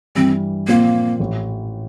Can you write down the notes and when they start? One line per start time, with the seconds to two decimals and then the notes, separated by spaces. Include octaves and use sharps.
0.15 G2 E3 G3 C4
0.68 A#2 F3 A#3 C4 F4
1.19 A1 A2 E3